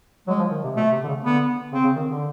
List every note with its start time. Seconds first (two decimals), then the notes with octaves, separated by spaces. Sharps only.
0.27 F#3 G#3
0.39 F3
0.51 D#3
0.64 C3
0.76 B2 A3
0.92 C3
1.03 D3
1.08 C#3
1.24 D3 B3
1.72 C#3 C4
1.84 C#3
1.96 D#3
2.08 D3